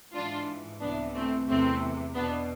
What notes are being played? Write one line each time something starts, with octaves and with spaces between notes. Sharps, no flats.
G#2 E3 D4 F4
C2 C3 E3 B3 D4
A3 C4
E2 C3 E3 A3 C4
E2 B2 B3 D4